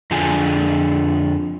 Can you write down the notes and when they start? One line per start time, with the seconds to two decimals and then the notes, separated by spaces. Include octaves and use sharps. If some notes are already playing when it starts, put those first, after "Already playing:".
0.11 F2 D3 D4 F4 G#4 G#5